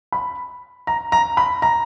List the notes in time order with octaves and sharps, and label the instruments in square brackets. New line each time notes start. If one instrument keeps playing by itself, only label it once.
[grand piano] B5
A#5
A#5
B5
A#5